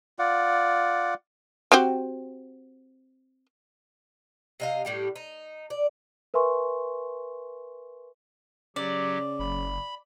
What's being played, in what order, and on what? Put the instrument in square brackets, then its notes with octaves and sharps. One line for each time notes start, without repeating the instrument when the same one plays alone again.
[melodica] F4 D5 F#5
[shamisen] C4 F#4 G4
[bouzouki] C3 D#5 F5
A2 G3 G4
D#4
D5
[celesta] A#4 B4 E5 G#5 C6 C#6
[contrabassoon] C#3 [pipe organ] F#3 G4 [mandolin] D5
[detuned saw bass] F#1 [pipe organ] B5